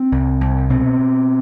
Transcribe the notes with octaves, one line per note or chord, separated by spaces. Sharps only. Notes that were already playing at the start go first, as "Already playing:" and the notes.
Already playing: C4
C2
C2
B2 C4
B2